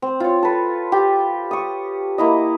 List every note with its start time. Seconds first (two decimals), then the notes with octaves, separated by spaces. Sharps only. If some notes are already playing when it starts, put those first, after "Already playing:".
0.02 C4
0.20 F4 C#5
0.43 A4 B4
0.92 G4 G5
1.51 C#6 D#6
2.18 A#3 E4 D#5